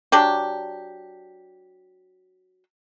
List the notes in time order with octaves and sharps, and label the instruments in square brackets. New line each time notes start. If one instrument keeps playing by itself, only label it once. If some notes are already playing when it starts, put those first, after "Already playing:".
[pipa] F#3 D4 G4